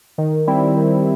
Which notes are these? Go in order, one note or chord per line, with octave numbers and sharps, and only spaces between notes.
D#3
G3 C4 E4
D#3